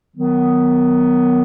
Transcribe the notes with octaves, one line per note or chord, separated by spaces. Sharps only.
D#3 F#3 B3